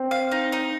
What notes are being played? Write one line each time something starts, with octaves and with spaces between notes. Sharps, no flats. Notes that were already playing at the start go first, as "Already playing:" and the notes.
Already playing: C4
F5
D#4
D#4